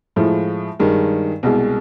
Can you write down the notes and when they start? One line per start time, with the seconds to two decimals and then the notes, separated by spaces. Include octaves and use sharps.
0.16 A2 F3 G#3
0.79 G2 D#3 G#3
1.43 C2 B2 G#3